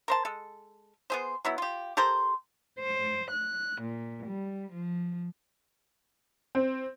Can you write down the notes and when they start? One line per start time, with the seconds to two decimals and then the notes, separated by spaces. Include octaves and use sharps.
0.08 A#4 C5 A5
0.25 G#3 A4
1.10 B3 G#4 C5
1.45 F#3 B3 E4
1.58 F4 G4
1.97 G4 A4 A#4 C5
2.79 C5
3.31 F#6
3.82 A#2
4.26 G3
4.72 F3
6.55 C4